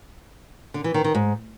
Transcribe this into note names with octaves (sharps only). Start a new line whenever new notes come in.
D3
E3
D#3
D#3
G#2